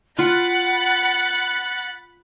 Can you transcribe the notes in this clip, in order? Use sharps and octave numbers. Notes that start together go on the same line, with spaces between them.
F4 F#5 B5 F#6 A6